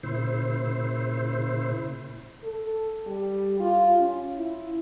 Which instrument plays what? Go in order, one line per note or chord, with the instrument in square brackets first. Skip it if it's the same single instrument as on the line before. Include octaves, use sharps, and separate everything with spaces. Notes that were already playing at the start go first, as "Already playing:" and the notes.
[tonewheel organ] A#2 C#3 E4 C5
[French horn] A4
G3
F4
C#4
E4